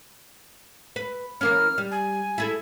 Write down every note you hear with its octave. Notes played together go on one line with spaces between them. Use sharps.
B4
E3 A#3 C#4 F6
G3
G#5
E4 G#4 A4